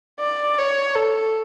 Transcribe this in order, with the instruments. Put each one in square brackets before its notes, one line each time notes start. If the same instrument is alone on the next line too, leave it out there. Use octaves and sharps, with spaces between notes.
[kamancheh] D5
C#5
A4